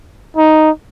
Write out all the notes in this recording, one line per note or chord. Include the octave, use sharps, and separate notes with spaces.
D#4